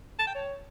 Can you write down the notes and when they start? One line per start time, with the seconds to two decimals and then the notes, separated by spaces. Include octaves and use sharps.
0.19 A5
0.27 G5
0.35 C#5